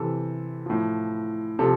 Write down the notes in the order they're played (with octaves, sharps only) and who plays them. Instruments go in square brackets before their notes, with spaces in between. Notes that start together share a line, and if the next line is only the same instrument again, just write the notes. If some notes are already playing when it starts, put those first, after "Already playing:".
Already playing: [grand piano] C3 E3 A4
A2 F3
C3 F3 A4